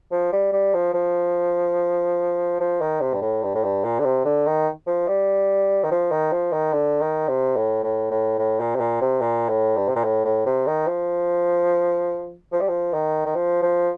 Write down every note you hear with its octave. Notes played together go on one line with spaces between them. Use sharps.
F3
G3
G3
F3
F3
F3
D#3
C3
G2
A2
G2
A2
G2
A#2
D3
C3
D3
D#3
F3
G3
D#3
F3
D#3
F3
D#3
D3
D#3
C3
A2
A2
A2
A2
A#2
C3
A#2
C3
A#2
A2
G2
C3
A#2
A2
A2
C3
D#3
F3
F3
G3
F3
D#3
D#3
F3
F3